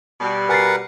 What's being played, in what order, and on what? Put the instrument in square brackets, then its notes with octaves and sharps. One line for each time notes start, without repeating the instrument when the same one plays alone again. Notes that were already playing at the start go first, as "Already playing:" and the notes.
[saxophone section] B2 G3
[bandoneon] A#4 B4 F#5 [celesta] G#5 A6 C7